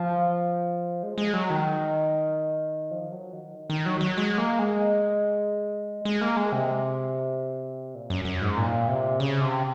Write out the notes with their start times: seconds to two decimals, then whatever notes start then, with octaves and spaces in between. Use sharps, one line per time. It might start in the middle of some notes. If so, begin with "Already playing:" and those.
Already playing: F3
1.03 G#3
1.18 G#3
1.33 F#3
1.50 D#3
2.91 F3
3.12 F#3
3.33 D#3
3.70 D#3
3.86 F#3
4.01 F#3
4.17 G#3
4.38 A#3
4.59 G#3
6.05 G#3
6.21 A#3
6.37 G#3
6.52 C3
7.95 A#2
8.10 F#2
8.25 F#2
8.42 G#2
8.57 A#2
8.88 C3
9.20 C#3
9.41 C3